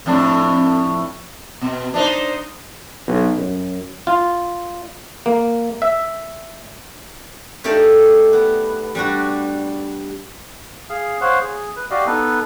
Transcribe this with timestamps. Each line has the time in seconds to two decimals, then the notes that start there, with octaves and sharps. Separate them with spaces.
0.06 F2 A2 D4
1.61 B2
1.94 D4 D#4 C5
3.07 B1
3.38 F#2
4.07 F4
5.26 A#3
5.82 E5
7.64 A3 D#4 G4 A4 D5 F5
8.33 B3
8.95 G3 D4 F#4
10.90 G#4 F5
11.21 C5 C#5 F5 F#5
11.41 G#4
11.76 B4
11.91 F#4 G4 D5 D#5 F5
12.06 B3 D#4 A4 B4